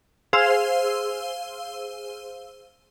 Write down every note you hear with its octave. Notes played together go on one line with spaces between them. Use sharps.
G#4 C5 F5 E6